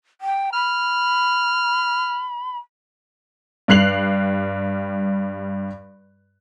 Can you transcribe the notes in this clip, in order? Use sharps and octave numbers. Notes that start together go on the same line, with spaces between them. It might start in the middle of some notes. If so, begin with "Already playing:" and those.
G5
B5 F6
G2 G3 F#6 C7 F7 F#7